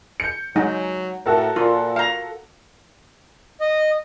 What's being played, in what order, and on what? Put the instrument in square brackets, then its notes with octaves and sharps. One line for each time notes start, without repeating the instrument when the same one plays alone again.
[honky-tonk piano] G6 C#7
[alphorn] F#3 [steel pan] G#3 D#4
[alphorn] A2 [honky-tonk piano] F#4 A4 A#4
[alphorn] A#2 [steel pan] F4
[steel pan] F5 A#5
[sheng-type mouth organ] D#5